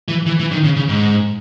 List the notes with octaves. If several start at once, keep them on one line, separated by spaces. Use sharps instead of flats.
E3
E3
E3
D#3
C#3
C#3
G#2